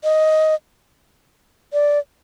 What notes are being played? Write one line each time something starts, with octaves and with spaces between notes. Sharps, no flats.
D#5
D5